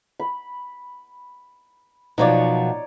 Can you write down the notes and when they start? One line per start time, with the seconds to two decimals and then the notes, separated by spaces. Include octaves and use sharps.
0.20 B5
2.18 B2 F3 F#3 D#4 C#5 D5